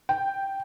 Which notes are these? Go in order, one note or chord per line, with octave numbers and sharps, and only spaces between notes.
G5